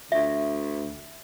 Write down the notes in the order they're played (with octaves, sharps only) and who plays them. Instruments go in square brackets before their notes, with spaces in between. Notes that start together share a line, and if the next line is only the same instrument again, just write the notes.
[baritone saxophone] D2 [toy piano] E5